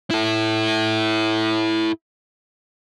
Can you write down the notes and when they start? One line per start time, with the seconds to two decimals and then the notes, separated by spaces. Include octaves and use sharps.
0.11 E4 A4